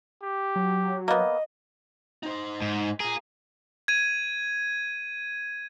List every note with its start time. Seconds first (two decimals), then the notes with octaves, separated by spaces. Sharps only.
0.23 G4
0.56 F#3
1.08 A#3 B3 D#5
2.23 D#4 C5
2.62 G#2
3.00 F4 G#4 A#4
3.88 G#6 D#7